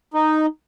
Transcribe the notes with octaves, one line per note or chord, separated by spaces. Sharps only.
D#4